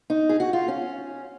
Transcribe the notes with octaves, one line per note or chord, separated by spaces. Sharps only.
D#4
G#4
F#4
F4
C#4